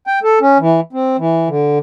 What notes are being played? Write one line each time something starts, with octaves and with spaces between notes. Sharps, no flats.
G5
A4
C#4
E3
C4
E3
D3